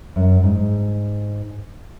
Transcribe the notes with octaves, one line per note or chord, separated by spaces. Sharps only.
F#2
G#2